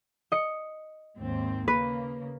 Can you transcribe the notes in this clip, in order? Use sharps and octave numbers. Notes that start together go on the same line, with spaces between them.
D#5 C#7
D#2 G#2 C4
C#3 A#3 B4